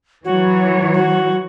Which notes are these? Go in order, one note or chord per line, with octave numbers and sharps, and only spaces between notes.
E3 F#3 F#4 C#5
F#4